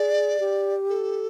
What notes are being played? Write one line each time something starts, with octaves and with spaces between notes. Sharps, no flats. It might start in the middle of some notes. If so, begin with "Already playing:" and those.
Already playing: G#4 D5
G4
A4